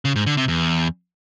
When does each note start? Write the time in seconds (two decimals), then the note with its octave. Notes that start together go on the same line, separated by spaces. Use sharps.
0.05 C#3
0.16 G#2
0.26 D3
0.37 C3
0.48 E2